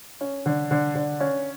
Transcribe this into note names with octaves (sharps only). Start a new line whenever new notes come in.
C#4
D3
D3
D3
C#4